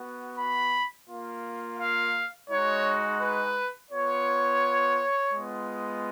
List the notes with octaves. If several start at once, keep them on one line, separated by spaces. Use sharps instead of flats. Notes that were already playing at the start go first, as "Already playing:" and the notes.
Already playing: B3 F#4
B5
A#3 F4
F5
G#3 D#4 F#4 C#5
B4
B3 F4 C#5
G#3 B3 F4